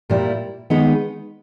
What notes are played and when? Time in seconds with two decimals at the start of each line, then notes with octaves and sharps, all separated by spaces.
0.10 A#2 G3 A#3 E4
0.70 D#3 G#3 B3 D#4